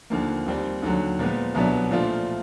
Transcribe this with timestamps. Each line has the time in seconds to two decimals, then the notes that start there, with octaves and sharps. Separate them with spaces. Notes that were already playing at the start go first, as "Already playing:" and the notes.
0.10 D#2 D3 F3 A#3
0.46 D#2 D#3 G3 C4
0.82 D#2 D3 F#3
1.19 A#2 F3 G#3 B3
1.55 C2 B2 F#3 B3 D4
1.91 A#2 F3 A3 D4 F4